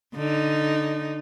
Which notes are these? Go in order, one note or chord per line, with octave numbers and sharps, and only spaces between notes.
D3 D#4